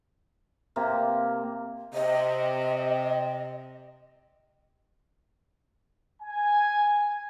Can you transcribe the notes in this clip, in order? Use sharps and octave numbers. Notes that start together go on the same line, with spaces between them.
C3 A#3
C3 D#5
G#5